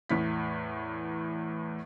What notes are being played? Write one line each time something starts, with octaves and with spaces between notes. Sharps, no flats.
E2 A2 B6